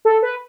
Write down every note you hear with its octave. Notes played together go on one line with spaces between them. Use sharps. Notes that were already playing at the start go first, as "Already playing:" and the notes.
A4
B4